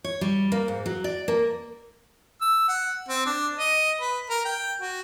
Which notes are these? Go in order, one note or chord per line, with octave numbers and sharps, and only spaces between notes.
C#5
G3
A#3
G#2
F#3
D5
A#3
E6
F#5
C4
D4
D#5
B4
A#4
G5
F#4